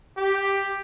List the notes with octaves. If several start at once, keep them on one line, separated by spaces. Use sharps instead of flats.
G4